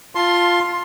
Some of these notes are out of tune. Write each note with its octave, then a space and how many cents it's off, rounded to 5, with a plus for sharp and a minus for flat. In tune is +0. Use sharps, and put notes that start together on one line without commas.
F4 +0 A5 +5 C6 +15